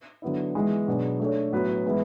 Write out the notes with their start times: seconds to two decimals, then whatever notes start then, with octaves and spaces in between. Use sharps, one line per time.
0.22 D3 F#3 B3 E4
0.55 E3 G#3 B3
0.88 B2 F#3 B3 D4 G#4
1.20 A3 D4 A4 C#5
1.52 A2 F#3 B3 F#4 B4
1.85 E3 G#3 B3 E4